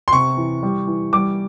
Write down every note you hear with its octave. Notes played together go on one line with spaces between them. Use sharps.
C6
C3 C#6
E3
G3
E3
G3 D6